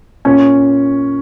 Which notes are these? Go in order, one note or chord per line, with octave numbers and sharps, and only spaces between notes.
A#2 C#4